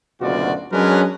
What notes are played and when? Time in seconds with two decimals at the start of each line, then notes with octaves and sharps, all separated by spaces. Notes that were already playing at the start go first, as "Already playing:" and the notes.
0.21 F#1 D2 B2 F4 F#4 D5
0.72 F#3 G#3 C#4 D4 A#4 B4